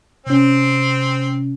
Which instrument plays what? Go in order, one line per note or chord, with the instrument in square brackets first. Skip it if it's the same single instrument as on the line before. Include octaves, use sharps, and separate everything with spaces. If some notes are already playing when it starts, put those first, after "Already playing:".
[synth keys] C3 C#4 [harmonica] C4